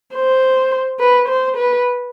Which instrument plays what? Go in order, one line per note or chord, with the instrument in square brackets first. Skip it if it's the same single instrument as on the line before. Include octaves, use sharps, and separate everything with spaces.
[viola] C5
B4
C5
B4